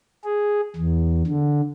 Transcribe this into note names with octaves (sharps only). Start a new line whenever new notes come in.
G#4
E2
D3